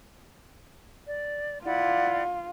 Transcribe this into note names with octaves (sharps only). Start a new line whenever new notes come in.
D5
E4 F4 D5 F#5